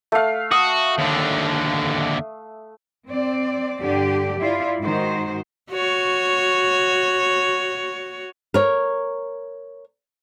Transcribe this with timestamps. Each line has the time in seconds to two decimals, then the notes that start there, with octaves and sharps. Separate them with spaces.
0.12 A3 F5
0.51 F#4 D#6
0.99 D#2 D3
3.07 C4 D5
3.81 G2 D3 G4 D5
4.39 E4 F4 D5
4.81 G#2 D#3 F#4 C5
5.71 F#4 C#5
8.54 A#4 C#5